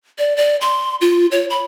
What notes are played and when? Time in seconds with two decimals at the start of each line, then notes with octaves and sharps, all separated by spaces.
0.18 D5
0.37 D5
0.61 C6
1.01 F4
1.31 C#5
1.50 B5